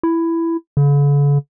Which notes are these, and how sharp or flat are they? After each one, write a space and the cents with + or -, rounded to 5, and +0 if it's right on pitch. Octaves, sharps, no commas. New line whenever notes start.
E4 +10
D3 -45